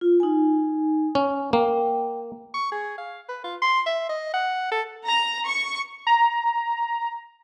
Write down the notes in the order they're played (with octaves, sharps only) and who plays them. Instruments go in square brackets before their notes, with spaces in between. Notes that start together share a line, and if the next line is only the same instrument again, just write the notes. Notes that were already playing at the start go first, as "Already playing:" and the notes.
[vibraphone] F4
D#4 G#5
[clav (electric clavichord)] C#4
[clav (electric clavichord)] A#3 [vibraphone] G5
[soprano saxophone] C#6
G#4
F5
B4
F4
C6
E5
D#5
F#5
A4
[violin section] A#5
C#6
[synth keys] A#5